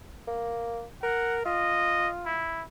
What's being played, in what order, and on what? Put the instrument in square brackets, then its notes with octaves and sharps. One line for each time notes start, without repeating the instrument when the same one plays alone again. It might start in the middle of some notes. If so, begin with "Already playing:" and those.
[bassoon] A#3
[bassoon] A#4 [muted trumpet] F#5
[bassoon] F4 [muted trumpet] D#5
[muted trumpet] E4